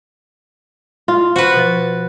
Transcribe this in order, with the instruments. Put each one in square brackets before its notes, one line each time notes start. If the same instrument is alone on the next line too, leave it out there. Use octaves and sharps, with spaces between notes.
[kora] F4
[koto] F#4 B4 [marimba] C5
[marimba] B2 F3 A6